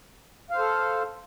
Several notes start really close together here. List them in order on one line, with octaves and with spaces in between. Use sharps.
F5 C5 A4